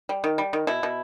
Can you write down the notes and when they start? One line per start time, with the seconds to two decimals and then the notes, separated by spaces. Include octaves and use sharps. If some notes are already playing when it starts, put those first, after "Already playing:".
0.09 G3
0.24 D#3
0.38 G3
0.53 D#3
0.67 B2 E4
0.83 B2